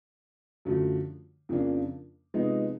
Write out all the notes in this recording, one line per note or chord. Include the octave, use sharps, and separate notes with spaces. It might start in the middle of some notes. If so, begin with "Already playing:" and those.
F#2 D3 F3 A3
F2 C#3 F3 A#3 D4
C3 F3 G#3 B3 D#4